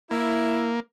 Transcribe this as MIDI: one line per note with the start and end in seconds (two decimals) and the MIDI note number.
0.11 0.80 58
0.11 0.70 64